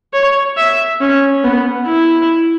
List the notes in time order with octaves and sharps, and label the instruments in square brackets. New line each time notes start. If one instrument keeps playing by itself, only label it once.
[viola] C#5
E5
C#4
B3
E4